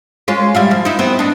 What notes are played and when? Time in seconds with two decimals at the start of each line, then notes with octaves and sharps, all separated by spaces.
0.28 G#3 C#4 F4
0.55 G3 E4 F5
0.71 F3
0.85 D#4 E4
0.99 B3 C4
1.19 D4 D#4